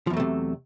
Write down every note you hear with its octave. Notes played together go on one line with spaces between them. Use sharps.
E2 C3 F3 F#3 A3